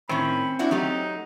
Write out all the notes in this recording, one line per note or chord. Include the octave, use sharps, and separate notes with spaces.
A2 D#3 C4 C#4 B5
D4 E4 F#4
F#3 A3 D#4 G4